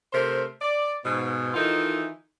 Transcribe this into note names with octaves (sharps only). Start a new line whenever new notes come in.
C3 A3 A#4 C5
D5
G#2 B2
D#3 E3 D#4 F4 A4